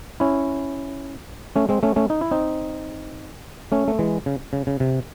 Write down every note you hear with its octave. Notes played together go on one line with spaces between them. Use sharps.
C#4 E4
A3 C#4
G#3 C4
A3 C#4
A3 C#4
D#4
E4
C4 D#4
A3 C#4
A3
E3 G#3
C#3
C#3
C#3
C3